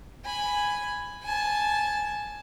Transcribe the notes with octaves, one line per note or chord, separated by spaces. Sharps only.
G#5 B5
G#5 A5